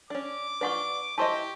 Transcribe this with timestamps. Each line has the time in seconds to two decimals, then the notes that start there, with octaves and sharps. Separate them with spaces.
0.10 C#4 D4 D6
0.61 D4 F4 B4 F#5 C#6
1.18 E4 G4 C5 D#5 A5 C6 C#6